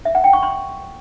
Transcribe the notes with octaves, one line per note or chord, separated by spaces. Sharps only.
E5
F#5
G5
C#6
C6